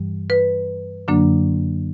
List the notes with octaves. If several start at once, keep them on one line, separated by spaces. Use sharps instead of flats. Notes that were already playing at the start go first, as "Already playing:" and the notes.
Already playing: G2 E3 G3
B4
F#2 D3 F#3 A#3 D4